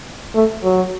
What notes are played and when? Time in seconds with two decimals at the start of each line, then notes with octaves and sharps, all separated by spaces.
0.35 A3
0.64 F#3